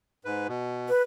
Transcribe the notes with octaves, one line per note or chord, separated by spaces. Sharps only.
G#2 B4
B2
B4